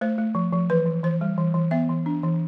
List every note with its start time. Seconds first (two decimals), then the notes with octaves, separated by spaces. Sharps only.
0.01 A3 C5
0.18 A3
0.35 F3
0.53 F3
0.70 E3 B4
0.86 E3
1.03 E3 C5
1.21 G3
1.38 E3
1.54 E3
1.71 B3 E5
1.89 E3
2.06 D4
2.23 E3